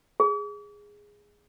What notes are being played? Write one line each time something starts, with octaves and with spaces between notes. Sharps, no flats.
G#4